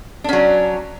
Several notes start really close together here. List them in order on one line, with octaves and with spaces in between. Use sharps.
D4 C#4 F#3